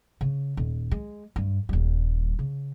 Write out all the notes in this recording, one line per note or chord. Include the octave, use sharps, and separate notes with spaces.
C#3
D#1
G#3
G2
D#1 G3
C#3